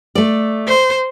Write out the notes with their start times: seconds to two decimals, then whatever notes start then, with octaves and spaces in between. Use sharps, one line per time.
0.15 A3 D5
0.68 C5